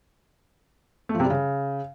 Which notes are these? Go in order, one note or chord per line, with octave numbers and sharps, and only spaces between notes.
A3
F3
C3
G3
C#3